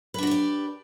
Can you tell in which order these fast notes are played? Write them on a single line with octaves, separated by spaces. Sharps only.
B4 D4 F#4 G4 D5